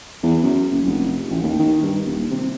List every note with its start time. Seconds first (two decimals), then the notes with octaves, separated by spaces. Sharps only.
0.23 E2
0.43 F#2
0.71 F#1
0.86 F1
1.30 A1
1.43 D#2
1.59 D#3
1.83 G2
2.06 D#1
2.31 C3